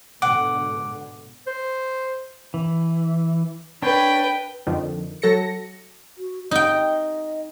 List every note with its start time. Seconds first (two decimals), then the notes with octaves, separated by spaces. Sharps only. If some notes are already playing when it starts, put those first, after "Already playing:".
0.22 G#2 B2 D3 F#5 D6
1.47 C5
2.54 E3
3.82 D4 B4 C#5 G5
4.67 F2 D3 D#3 F3
5.22 F#3 A4 A#6 C#7
6.18 F#4
6.51 D#4 D#5 G5